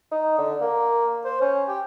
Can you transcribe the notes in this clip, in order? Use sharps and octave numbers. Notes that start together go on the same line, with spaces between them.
D#4
D3
A#3
C5
C#4
G4